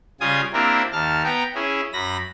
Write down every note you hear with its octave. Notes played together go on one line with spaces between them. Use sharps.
C#3 G3 F4 G#5 D#6
A#3 C4 D4 E4 G4 A#4
D#2 A5 F6
B3 G5 A#5
C#4 E4 G#4
F#2 B5 A#6